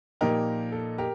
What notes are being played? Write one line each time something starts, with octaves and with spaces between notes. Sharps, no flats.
A#2 F3 A#3 D#4 G4 A#4
A4
G4 A#4